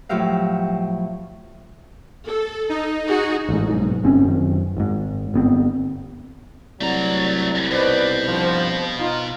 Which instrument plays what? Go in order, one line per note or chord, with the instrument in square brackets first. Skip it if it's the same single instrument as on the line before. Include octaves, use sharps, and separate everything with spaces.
[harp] A2 F3 F#3 G4 E5 F5
[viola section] A4
[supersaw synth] D#4
[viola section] F#4 G#4
[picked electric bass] A1 G#2
B1 G#2
G1 C4 C#4
F#2 D#3
G#1 G#2
G1 B3 C4
[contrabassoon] C2 [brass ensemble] F#3 [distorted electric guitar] A3 A#5 [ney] D5
[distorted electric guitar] B2 [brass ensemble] D#4 B4 D5 [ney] C5
[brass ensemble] G2 F3
D#4 F4